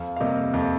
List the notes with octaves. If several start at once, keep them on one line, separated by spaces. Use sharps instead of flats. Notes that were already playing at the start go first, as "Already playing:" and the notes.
Already playing: F2 F5
F5
C3 G3 A#3 D#5
F2 D#5